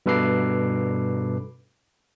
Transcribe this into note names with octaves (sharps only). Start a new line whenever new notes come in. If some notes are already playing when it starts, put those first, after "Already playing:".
G2 B2 A4 B4 D6 C7